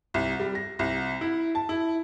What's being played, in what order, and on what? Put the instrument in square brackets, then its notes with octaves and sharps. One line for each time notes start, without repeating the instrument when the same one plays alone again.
[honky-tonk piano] C2
G3
A#6
C2
E4
A5
E4